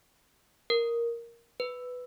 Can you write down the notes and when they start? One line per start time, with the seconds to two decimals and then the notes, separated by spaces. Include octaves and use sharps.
0.70 A#4
1.60 B4